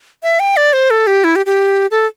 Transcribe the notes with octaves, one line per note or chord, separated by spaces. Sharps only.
E5
G5
D5
C5
A4
G4
E4
G4
G4
A4